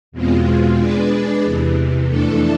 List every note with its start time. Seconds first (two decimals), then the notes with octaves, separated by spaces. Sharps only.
0.12 E2 B2 G#3 C4 F4
0.77 G#3 D4 G#4 B4 D5
1.43 E2 C3 E3
2.08 F2 E3 A3 D4 A4